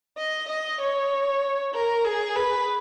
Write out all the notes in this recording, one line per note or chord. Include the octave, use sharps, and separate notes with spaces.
D#5
D#5
C#5
A#4
G#4
B4